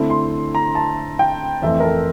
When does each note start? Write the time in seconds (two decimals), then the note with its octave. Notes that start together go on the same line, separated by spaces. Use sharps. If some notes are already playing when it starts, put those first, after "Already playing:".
Already playing: D3 A3 C4 E4
0.10 C6
0.55 A#5
0.75 A5
1.19 G5
1.62 F2 E3 A3 C4 E5
1.80 A#4
1.83 A4